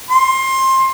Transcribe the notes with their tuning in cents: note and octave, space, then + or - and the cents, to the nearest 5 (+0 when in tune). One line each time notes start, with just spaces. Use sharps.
C6 +20